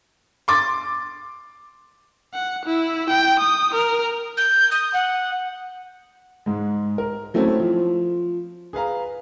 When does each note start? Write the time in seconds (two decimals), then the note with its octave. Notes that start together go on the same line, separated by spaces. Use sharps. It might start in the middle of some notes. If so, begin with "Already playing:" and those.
0.48 C6 D6 A6
2.34 F#5
2.66 E4
3.10 G5
3.40 D#6
3.74 A#4
4.37 G6
4.71 D#6
4.94 F#5
6.46 G#2 G#3
6.98 A#4
7.34 F#3 A3 C4 C#4 E4
7.60 F3
8.73 G#4 B4 F5 A#5